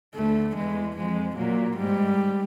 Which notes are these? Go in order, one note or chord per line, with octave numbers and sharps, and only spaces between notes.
D2 D3 A3
E2 E3 G#3
F2 F3 G#3
A#2 F#3 A#3
G#2 G3 G#3